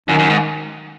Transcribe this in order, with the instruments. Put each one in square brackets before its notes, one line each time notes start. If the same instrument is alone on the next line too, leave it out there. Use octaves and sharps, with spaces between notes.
[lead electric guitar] F#2 [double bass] D#3
[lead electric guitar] F#2
G#2